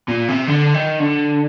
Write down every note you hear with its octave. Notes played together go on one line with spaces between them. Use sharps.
A#2
C3
D3
D#3
D3